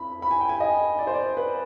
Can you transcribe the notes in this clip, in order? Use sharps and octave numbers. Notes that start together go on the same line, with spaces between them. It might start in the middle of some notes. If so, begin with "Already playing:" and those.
Already playing: F2 B5
B5
G#5
G5
G#5
D#5
D5
C5
D5
B4